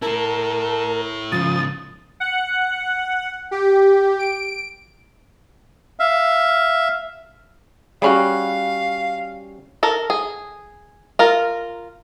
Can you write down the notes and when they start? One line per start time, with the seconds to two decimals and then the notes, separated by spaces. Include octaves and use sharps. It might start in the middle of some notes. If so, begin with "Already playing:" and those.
0.02 E4 A4 A#4 A5
1.32 G#2 C#3 F3 D#6 A6
2.20 F#5
3.51 G4
4.19 D7
5.99 E5 F5
8.02 G3 C#4 F#4 G#4 C#5 F5 B5
9.83 A4 A#4
10.10 G#4
11.19 F4 A#4